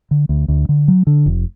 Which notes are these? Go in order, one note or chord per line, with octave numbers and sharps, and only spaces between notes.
D3
D2
D2
D3
F#3
D3
F1